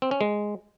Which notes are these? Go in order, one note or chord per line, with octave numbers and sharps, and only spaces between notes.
C4
C#4
G#3